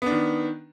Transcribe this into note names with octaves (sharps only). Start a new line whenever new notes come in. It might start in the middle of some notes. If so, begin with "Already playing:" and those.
D#3 B3 D4